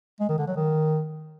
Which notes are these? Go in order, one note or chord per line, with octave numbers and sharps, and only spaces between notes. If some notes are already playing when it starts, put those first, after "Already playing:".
G#3
D#3
D3
F#3
D#3